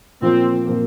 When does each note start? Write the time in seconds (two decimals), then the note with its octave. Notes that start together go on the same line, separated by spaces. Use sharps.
0.22 A#2 F3 A#3 C4
0.66 A#2 F3 A#3